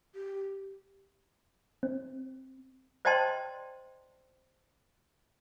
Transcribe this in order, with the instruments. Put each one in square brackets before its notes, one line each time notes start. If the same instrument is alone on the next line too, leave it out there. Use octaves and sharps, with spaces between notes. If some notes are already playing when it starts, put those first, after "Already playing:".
[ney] G4
[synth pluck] C4
[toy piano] C5 D5 D#5 G5 A5 C6